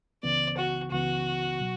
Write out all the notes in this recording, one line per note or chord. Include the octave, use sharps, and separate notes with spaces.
C#2 C#3 E3 B3 D5
F#4
C#2 C#3 E3 B3 F#4
B2 F#3